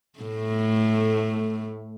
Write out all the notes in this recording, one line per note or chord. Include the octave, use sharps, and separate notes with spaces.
A2 A3